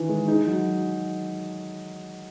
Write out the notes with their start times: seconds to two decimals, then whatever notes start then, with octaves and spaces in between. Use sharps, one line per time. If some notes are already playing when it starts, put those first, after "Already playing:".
Already playing: D#3 E3
0.09 G#3
0.28 D#4
0.47 F#3